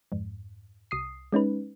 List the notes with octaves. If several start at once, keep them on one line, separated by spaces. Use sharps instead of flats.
F2 G#2
C2 D#6 C7
G#3 C#4 D#4 B4